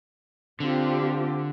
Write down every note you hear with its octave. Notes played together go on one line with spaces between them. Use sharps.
D3 C4 F4 G4